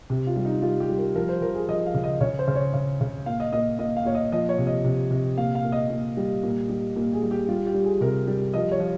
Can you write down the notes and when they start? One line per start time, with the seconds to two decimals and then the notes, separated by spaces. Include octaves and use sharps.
0.10 C3
0.27 F4
0.36 G3
0.45 D#4
0.62 G3 F4
0.80 G4
0.89 G3
0.98 A#4
1.15 F3 A#4
1.29 C5
1.42 F3 A#4
1.55 G#4
1.68 F3 D#5
1.86 F5
1.94 C#3
2.04 D#5
2.21 C#3 C#5
2.39 C5
2.48 C#3
2.56 C#5
2.74 C#3
3.01 C#3
3.26 A#2 F5
3.40 D#5
3.53 A#2 D#5
3.79 A#2 D#5
3.97 F5
4.05 A#2 C#5
4.15 D#5
4.32 F3 D#5
4.49 C#5
4.58 C3
4.67 D#5
4.85 C3
5.11 C3
5.37 A#2 F5
5.55 F5
5.64 A#2
5.72 D#5
5.90 A#2
6.17 G3
6.43 A#2
6.69 G3
6.96 A#2
7.13 G#4
7.22 G3
7.31 G4
7.48 G3 F4
7.66 G4
7.74 G3
7.84 G#4
8.01 C3 A#4
8.28 G3
8.54 F3 D#5
8.72 C#5
8.80 F3